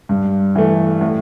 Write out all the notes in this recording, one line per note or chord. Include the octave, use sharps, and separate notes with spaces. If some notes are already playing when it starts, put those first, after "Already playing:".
G2
E3 A3
A2